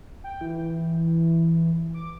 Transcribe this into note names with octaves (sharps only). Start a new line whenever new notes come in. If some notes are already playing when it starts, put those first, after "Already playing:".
G5
E3
D6